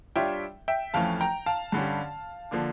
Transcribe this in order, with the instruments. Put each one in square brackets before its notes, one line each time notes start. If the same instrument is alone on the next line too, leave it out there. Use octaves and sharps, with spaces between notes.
[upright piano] G3 D4 F4 C#5 [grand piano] E5 G5
[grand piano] E5 G5
[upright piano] F2 E3 A3 C#4 [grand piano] F5 A5
[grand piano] G5 A#5
F5 A5
[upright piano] G2 D3 G3 C#4 G4
D3 F3 A#3 D4